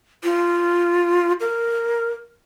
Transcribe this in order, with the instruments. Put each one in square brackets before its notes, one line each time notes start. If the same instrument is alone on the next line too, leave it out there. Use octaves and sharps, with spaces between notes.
[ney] F4
A#4